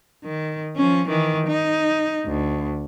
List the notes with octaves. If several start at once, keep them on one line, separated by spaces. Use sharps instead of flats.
D#3
F3 C#4
D#3 E3
D#4
D2